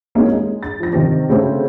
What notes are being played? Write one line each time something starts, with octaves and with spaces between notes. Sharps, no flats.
G#3 A#3 C#4 D#4 E4 F#4
G#3 G#4
A6
F3 A#6
C3 D#3
C#3 A3 C4 C#4 F#4 A4